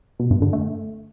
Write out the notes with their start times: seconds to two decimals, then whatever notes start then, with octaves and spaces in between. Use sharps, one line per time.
0.19 B2
0.31 G2
0.42 D3
0.53 A3